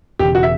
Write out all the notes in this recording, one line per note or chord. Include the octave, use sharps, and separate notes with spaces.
E1 E2 C#3 G4
F#4
E5